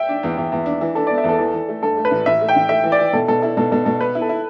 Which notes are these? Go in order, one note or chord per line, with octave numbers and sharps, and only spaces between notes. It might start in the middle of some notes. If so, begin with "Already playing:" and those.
Already playing: E5 G5
D4
E2
E2
E2
D4
E3
D4 A4
B3 D5
E5
E2 A4
E3
E3
A3
G2 A4
A3
B4
A1
A1 E5
A3
G5
A1
A3 E5
E3
D5
E3
B2 A4
B2 A4
E4 A4
B2 A4
B2 A4
B2 A4
B3 B4
E4
A4
E4